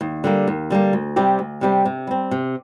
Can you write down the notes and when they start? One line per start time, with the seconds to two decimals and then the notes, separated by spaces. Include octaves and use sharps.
0.01 D#2
0.24 D3 G3 A#3
0.47 D#2
0.70 D3 G3 A#3
0.93 D2
1.16 C3 G3 C4 G4
1.39 D2
1.61 C3 G3 C4 G4
1.85 C3
2.07 G3 C4
2.31 C3